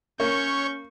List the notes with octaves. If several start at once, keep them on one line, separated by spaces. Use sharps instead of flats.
A#3 C#4 C#5 C#6 G6